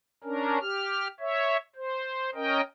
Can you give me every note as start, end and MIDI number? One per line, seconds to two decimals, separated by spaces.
0.24 0.58 61
0.24 0.58 62
0.24 0.58 70
0.61 1.08 67
0.61 1.08 89
1.20 1.57 73
1.20 1.57 76
1.76 2.30 72
2.35 2.61 61
2.35 2.61 70
2.35 2.61 75
2.35 2.61 79